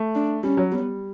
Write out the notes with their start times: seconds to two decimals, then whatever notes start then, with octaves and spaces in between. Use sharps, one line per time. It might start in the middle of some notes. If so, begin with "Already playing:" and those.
Already playing: A3
0.15 D4
0.43 G3 C#4
0.57 F#3
0.72 G3 B3